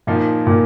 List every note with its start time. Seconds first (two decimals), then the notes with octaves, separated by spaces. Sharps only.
0.07 A#2 F3 A#3 D#4
0.47 A#2